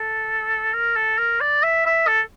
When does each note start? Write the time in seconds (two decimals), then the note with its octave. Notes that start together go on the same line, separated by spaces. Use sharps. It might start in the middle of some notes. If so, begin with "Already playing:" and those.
Already playing: A4
0.73 A#4
0.96 A4
1.18 A#4
1.40 D5
1.63 E5
1.86 E5
2.07 A4